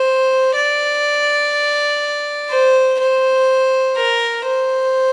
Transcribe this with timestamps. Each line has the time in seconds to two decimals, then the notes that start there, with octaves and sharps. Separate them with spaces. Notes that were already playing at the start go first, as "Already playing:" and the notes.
Already playing: C5
0.56 D5
2.50 C5
3.00 C5
3.97 A#4
4.45 C5